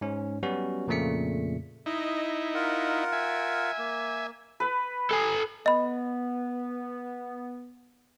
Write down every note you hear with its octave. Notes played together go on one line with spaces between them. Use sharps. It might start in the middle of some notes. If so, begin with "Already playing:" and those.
G#2 C#4
F#3 G3 B3 C#4 F#4
F2 A#2 C#3 A3 B6 C#7
D#4 E4 D#5
F4 A#4 F#5
E5 G#5
A#3
B4
A4 G#5
B3 D#5 B5